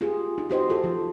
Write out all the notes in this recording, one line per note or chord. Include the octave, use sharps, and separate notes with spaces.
F4 G4 G#4
D#4
F#4 G4 C5 D#5
F4 A4
F3